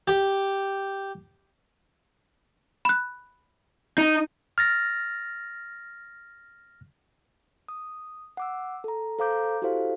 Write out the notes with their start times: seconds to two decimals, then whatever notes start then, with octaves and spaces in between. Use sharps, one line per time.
0.08 G4
2.85 B5 F#6
3.98 D#4
4.58 F6 A6 A#6
7.68 D#6
8.37 F#5 D6 E6
8.84 A4 A#5
9.19 A4 C5 F5 A#5 D6 G6
9.62 E4 F#4 G4 A4 C5 F5